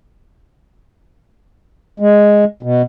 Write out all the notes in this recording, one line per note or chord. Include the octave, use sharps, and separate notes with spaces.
G#3
B2